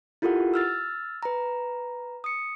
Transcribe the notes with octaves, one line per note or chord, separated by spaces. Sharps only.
E4 F4 G4 A4 A#4 F#5
E6 F6 A6
B4 A#5
D#6 C#7